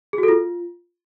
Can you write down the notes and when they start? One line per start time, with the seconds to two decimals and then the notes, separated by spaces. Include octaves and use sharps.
0.13 G#4
0.18 F#4
0.23 A4
0.28 F4